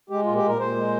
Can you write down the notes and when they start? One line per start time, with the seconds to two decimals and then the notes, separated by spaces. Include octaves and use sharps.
0.10 G#3 G4
0.23 A#2 F4
0.36 G4
0.43 A#2 A#4
0.59 A#2 C5
0.76 G#3